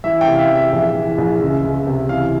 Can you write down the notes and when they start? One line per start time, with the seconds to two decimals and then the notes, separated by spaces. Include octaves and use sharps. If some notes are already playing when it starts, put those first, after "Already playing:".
0.04 E3 E5
0.21 G5
0.27 C3
0.35 F5
0.39 E5
0.51 E3 E5
0.73 A#1
0.95 E3
1.18 A#1
1.42 C#2
1.64 C#2
1.87 C3
2.09 E3 F5